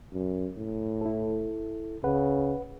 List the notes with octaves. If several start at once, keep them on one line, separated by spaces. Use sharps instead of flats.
F#2
A2
E4 A4
C#2 C#3 B4 F#5